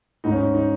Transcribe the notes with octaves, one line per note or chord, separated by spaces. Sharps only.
G#2 D#4
C#4
D#4
D#4